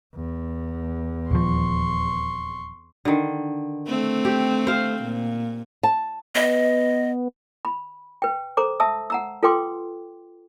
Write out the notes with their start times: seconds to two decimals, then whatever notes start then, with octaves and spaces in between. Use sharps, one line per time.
0.15 E2
1.31 D#1 F3 C6 C#6
3.05 D3 D#3
3.87 A3 C4
4.25 G4
4.67 C5 F5
5.03 A#2
5.83 A5
6.35 B3 D#5
7.65 B5
8.22 B4 G5
8.57 A4 C5 A#5 D6
8.80 E5 A5 D#6 E6
9.10 F#5 A#5 E6
9.43 F4 A4 B4 G5 C6 D6